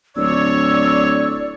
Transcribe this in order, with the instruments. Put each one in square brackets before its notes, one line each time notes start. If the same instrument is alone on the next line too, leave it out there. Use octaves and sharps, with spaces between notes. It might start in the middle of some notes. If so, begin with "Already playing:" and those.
[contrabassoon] D1 [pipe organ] C#5 [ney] D5 [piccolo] E6